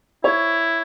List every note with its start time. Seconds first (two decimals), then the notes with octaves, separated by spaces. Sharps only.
0.24 E4 C#5